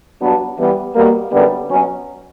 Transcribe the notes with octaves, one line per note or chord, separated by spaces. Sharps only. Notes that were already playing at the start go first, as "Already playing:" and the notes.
G2 F#3 B3 D4 F#4
E3 G3 B3
B2 G3 A#3
F#2 D3 G3 B3
B2 F#3 C#4